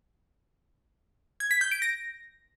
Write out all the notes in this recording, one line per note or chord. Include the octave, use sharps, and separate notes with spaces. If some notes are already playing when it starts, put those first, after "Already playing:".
G#6
B6
G6
D7
A#6